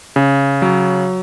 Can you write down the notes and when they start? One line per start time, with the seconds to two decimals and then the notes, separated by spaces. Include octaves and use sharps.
0.16 C#3
0.62 F#3